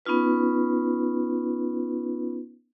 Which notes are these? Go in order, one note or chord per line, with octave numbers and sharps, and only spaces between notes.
B3 C#4 D#4 F4 B4